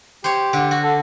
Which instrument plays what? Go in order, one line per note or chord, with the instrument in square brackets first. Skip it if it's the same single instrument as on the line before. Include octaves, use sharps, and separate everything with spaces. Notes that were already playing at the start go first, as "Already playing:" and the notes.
[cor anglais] G4 [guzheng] C5 C#5
[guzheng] D3
F#4
[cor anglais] A4